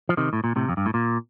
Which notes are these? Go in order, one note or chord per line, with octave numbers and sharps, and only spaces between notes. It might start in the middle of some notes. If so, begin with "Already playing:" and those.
F3
C3 D#3
A2
A#2
A2 C3
F2
G2
A2
A#2